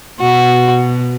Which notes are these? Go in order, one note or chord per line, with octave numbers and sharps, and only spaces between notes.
B2 F#4